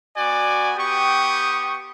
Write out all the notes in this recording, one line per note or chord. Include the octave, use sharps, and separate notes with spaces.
B3 F#4 D5 G#5
B3 G4 G5 C#6 D#6